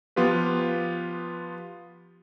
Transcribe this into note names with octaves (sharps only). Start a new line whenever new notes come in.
F3 B3 F4 G4 B4